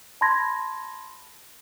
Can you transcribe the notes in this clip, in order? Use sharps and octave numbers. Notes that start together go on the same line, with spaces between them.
A5 B5 C6 G#6 A#6